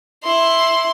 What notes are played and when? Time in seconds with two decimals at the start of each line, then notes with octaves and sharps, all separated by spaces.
0.24 E4 C6